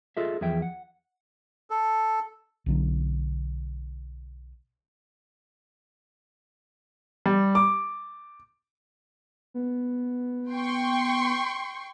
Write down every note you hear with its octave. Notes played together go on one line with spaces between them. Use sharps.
F4 G#4 A4 D#5 E5
E2 F3 G#4 E5 G5
F#5
A4
B1 D3 F#3
G3
D6
B3
G5 C6 C#6